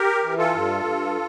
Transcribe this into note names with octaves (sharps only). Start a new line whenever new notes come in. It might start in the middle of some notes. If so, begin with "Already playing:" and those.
Already playing: G4 A#4
E3
F4 A4
G2
G2